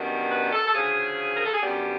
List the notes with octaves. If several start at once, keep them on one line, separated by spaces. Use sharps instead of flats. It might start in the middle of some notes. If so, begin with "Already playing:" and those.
Already playing: F#2 D#3 G3 B3 D4
B4
A4
A4
D2 C#3 F3 G#4
A#4
A4
G#4
F#2 D3 G3 B3 D4 G4